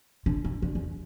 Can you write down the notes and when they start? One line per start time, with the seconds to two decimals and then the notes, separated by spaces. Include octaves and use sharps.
0.26 D3
0.45 E3
0.62 D3
0.75 E2